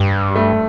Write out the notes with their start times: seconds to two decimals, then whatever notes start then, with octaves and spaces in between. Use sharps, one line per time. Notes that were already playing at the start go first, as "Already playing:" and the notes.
Already playing: G2 G3
0.36 A3